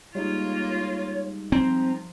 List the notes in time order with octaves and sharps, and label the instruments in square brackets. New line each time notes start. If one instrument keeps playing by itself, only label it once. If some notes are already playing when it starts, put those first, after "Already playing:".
[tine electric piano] G3 G#3 D#4 [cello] A#3 F4 [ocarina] C#5
[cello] F3 [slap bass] C4 [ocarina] A#5